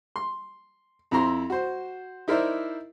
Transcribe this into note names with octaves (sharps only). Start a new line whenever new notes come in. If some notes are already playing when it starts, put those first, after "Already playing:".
C6
F2 C4 E4 A#5 C6
F#4 C5
D#4 E4 A#4 C5 D5 E5